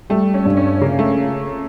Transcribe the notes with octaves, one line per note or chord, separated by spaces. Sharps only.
G3 A3
C#4
G2
C#4
C#3 A#3
A3